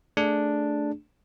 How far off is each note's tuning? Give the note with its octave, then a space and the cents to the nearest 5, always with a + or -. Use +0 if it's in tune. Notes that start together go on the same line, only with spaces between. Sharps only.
A3 +0 D4 +0 G#4 +0